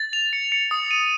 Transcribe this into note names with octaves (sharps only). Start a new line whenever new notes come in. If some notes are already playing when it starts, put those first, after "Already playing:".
Already playing: A6
F7
C#7
C#7
D#6
D#7